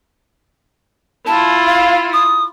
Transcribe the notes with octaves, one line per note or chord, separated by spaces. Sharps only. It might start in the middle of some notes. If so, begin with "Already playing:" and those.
E4 F4 A5
F5
D#6